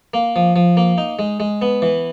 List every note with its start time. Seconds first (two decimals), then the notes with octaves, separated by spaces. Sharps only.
0.14 A#3
0.36 F3
0.56 F3
0.77 A#3
0.98 D#4
1.19 G#3
1.40 G#3
1.62 B3
1.82 E3